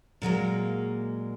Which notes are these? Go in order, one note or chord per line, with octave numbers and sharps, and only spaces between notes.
A#2 F#3 G#3 A#3